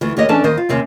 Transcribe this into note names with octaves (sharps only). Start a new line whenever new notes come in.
D2 E3
D#2 G4 C#5 D#5
E3 C#4 D4 A4 D5 A5
D#2 D#3 C5 D#5
F4
D#2 C3 C4 C#4